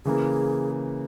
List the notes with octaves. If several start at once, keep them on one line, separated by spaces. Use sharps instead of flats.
C#3 E3 A#3 G#4